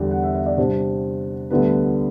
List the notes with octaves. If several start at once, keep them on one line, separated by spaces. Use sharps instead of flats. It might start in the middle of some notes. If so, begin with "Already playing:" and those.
Already playing: E2 D3 G3 G5
F#5
E5
E5
D5
C3 G3 D4 C5
D2 D3 G3 B3 D4 B4